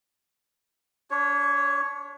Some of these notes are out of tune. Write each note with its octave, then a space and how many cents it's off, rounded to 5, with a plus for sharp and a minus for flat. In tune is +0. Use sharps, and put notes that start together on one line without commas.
D4 -35 C#5 +0